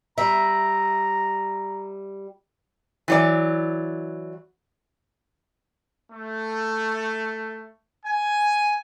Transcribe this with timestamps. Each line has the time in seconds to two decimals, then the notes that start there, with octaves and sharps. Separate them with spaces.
0.18 G3 E5 A#5
3.08 E3 F#3 D5
6.11 A3
8.05 G#5